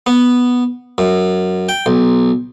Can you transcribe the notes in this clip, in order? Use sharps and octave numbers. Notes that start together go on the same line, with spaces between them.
B3
F#2
G5
B1